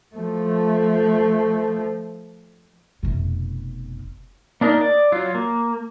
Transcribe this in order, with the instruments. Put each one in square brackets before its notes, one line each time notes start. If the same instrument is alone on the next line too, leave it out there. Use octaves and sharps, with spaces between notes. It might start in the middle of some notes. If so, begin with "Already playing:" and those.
[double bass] F3 A3
[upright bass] F1 B2
[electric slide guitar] A#3 D4 D#4 A#4
D5
F#3 F4
A#3